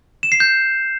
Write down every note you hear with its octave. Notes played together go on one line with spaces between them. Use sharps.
E7
C7
G6